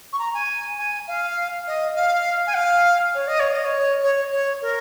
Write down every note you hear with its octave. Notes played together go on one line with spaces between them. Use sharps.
C#6
A#5
G#5
G#5
F5
D#5
F5
G#5
F5
C#5
D#5
C#5
D#5
C#5
C#5
C#5
A#4